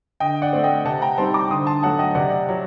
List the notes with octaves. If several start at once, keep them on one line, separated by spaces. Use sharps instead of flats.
D3 D#5 G5
D5 F#5
A3 C4
D#5 G5
C3 F#5 A5
G5 A#5
G3 C4 D#4 A5 C6
A#5 D6
D3 C6 D#6
A5 C6
F#3 A3 F#5 A5
D#5 G5
C3 D5 F#5
F#3